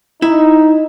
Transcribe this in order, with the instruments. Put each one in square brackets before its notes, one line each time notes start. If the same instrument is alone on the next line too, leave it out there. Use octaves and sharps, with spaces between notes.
[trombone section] D#4 [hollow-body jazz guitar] E4